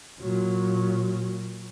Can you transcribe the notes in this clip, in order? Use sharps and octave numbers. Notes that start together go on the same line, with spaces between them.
A#2 F#3